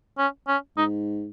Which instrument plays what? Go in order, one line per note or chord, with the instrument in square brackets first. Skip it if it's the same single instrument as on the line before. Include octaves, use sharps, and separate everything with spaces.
[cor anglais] C#4
C#4
[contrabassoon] G#2 [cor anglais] D#4